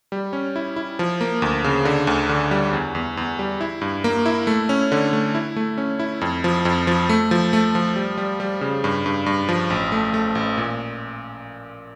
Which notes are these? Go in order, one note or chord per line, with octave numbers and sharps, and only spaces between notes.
G3
C#4
E4
E4
F3
A#3
D2
C#3
D3
D2
D3
G3
E2
E2
E2
G3
E4
G2
A#3
E4
A3
C#4
D3
A3
E4
A3
C#4
E4
F2
F3
F2
F3
A3
F3
A3
F3
G3
G3
G3
C#3
G2
G2
G2
F3
A1
A3
A3
A1
A#2